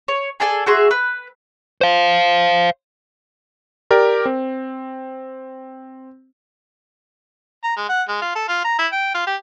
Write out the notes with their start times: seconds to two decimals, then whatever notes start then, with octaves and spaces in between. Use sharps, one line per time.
0.08 C#5
0.40 G#4 A4 D5 G#5
0.66 F#4 G#4 E5 C6
0.91 B4
1.81 C5 F5
3.91 G4 A#4 D5
4.26 C4
7.64 A#5
7.77 G#3
7.89 F#5
8.08 G#3
8.22 F4
8.35 A4
8.48 F4
8.64 A#5
8.79 E4
8.92 G5
9.14 F4
9.27 G4